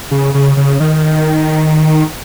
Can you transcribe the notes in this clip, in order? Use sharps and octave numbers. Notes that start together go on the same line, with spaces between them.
C#3
C#3
C#3
D#3